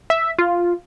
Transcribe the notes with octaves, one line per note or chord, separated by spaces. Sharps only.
E5
F4